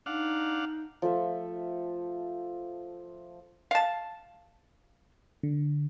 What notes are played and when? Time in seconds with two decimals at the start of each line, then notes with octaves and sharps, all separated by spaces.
0.06 D4 D#4 F5 F#5
1.02 F3 A3 A4 E5
3.71 F5 A5
5.43 D3